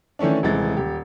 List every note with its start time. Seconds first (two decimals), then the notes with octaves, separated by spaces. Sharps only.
0.19 D#3 E3 A3 C#4 D4
0.43 D#1 C3 E3 G#3 A6
0.77 D#1 G4